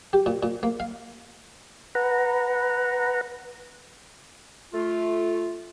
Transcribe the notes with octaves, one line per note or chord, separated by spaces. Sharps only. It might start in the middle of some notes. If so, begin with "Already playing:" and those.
G4
A#2
A#2
A#3
F5
B4 F#5 A#5
A3 F4